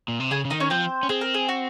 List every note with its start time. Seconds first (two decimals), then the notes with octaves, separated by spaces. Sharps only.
0.08 A#2
0.20 C3
0.31 C#3 G#4 G#5
0.45 C#3
0.50 D#3 D#4 D#5
0.60 C#4 C#5
0.70 F3 C4 C5
1.03 C#4
1.09 C4 G#4
1.21 A#4
1.34 G#4
1.49 F#4